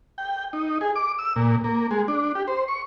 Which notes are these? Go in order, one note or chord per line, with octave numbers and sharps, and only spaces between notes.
G5
D#4
G#4
D6
E6
A#2
A#3
G#3
D4
G4
C5
C#6